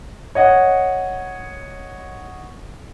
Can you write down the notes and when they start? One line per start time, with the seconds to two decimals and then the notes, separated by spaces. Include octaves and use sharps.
0.35 C#5 D#5 F#5